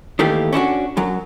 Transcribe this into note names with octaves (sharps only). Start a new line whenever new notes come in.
D#3 E3 A3 A#3 G4
C#4 D4 E4 F#4
F#2 F#3